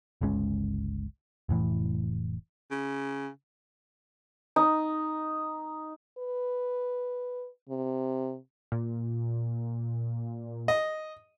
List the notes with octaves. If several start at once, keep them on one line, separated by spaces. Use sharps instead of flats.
G1 C#2 G#3 C#4
F1 A2 E3
C#3
D#4
B4
C3
A#2
D#5